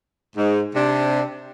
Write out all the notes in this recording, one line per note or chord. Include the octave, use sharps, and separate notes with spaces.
G#2
C3 D4